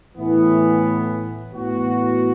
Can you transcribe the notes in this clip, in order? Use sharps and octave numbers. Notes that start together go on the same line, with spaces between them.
A2 E3 B3
A2 E3 B3 F#4